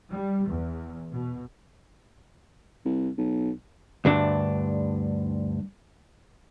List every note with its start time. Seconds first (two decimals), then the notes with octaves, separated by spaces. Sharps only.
0.11 G3
0.47 E2
1.12 B2
2.85 C2
3.18 B1
4.05 D2 G2 D4